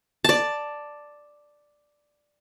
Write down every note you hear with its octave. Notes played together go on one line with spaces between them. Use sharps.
D5 A5